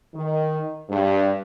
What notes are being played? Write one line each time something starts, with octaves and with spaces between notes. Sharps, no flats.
D#3
G2